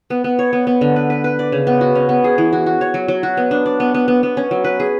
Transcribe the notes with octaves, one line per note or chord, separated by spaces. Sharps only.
B3
B3
C#5
B3
B3
D3
B4
B4
B4
D5
C#3
B3
F#4
C#4
B3
G#4
E3
F#4
F#4
C#5
F#3
F#3
F#4
B3
D4
D5
B3
B3
B3
B3
C#4
F#3
B4
G#4